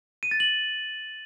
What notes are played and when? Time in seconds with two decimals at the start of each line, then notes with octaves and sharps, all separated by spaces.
0.23 D#7
0.31 A6
0.40 F#7